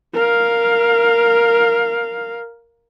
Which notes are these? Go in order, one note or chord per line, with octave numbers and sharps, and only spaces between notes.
A#4 F5